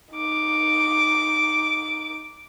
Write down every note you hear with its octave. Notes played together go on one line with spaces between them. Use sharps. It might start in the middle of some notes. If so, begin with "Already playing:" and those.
D#4 D6